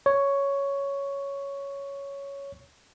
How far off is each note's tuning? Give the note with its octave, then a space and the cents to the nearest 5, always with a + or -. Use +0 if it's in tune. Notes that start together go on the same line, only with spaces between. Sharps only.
C#5 +5